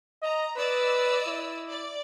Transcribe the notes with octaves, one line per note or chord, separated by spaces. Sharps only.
D#5 A#5
B4 D5 D#5 E6
E4
D5